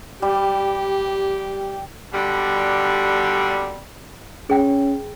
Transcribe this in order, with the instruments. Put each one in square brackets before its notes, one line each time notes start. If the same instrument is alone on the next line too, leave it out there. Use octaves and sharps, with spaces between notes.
[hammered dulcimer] G3 [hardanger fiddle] G4
[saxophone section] B2 D3 G3
[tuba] C#4 [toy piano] G#4 G5